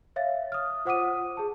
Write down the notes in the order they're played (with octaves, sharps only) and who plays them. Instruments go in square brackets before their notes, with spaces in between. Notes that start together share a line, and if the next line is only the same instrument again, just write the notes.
[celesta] C#5 E5 F5 A6
D#6 F6
F4 C5 F#5 D6 D#6 D#7
G#4 A5